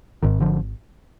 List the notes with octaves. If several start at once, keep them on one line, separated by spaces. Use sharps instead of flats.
G#1 G#2 D#3
D3 F3